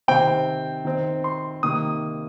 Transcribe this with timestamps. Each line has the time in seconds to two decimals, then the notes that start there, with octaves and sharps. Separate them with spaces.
0.08 C3 D#3 C4 G5
0.85 D#3 C4
1.24 C6
1.63 C3 D#3 A#3 D#6